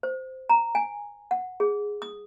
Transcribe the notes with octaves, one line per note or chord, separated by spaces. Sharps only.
C5
A#5
G#5
F#5
G#4
D#6